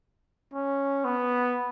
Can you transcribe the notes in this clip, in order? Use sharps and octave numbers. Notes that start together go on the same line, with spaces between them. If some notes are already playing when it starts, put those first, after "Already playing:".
C#4
B3